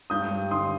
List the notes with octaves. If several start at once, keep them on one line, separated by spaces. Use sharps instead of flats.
G2 D#6 G6
G3
D3 C6 D#6